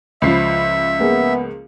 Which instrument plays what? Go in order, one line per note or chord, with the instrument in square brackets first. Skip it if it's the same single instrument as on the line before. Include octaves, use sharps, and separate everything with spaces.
[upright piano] C#2 F3 [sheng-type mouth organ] E5 [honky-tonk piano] B5 C7
[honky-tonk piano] A#3 G#4 [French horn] B3